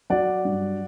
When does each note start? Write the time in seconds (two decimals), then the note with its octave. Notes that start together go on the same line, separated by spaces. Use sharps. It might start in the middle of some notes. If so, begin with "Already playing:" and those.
0.10 F#3 D5 F#5
0.45 G2